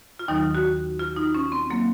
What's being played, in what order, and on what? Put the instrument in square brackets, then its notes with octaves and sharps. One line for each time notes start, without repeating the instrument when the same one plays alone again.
[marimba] F4
D#2 D#3 F#3 D#4
F#4
F4
D#4
C#4
C4
F#3 A#3